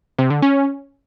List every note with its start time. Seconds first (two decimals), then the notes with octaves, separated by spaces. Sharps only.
0.18 C3
0.30 D3
0.42 C#4